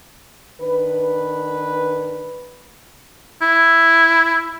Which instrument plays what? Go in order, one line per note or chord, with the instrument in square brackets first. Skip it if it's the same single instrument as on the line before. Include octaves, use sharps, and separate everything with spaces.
[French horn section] D#3 D4 B4
[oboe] E4